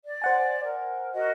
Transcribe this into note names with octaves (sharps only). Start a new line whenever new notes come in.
D5
C5 F#5 G#5
A#4
F#4 A#4 D#5